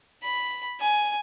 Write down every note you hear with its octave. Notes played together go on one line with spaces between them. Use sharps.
B5
G#5